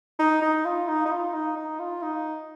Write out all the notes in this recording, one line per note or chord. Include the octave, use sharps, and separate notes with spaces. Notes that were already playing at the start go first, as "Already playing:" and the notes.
D#4
D#4
F4
D#4
D#4
F4
D#4
D#4
F4
D#4